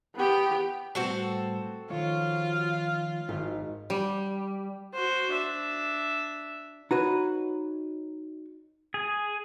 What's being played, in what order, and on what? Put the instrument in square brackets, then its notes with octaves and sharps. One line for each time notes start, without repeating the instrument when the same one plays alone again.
[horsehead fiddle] B3 G4
[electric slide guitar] A2 G3 B4 [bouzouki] C4 F#4 A4
[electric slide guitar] D#3 F3 G#3 [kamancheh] F4 F5 [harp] C#5
[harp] G#1 [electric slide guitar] E4 F#4 G4
[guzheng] G3
[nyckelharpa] F#4 C5
D4 E5
[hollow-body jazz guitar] D#4 F#4 B4 C#5
[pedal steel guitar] G#4